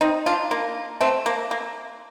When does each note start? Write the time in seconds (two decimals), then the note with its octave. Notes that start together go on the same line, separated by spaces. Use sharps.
0.01 C4 D#4
0.26 D4 F4
0.51 A#3
1.01 A3 C4
1.26 A#3
1.51 A#3